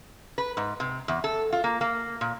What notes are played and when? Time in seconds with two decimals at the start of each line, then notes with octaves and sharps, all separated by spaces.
0.38 B4
0.57 G#2
0.80 C3
1.08 E2
1.24 A4
1.53 F4
1.64 A#3
1.81 A#3
2.21 A#2